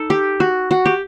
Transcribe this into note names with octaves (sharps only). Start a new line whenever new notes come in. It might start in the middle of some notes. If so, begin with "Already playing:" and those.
Already playing: D#4 A4
G4
F#4
F#4
G4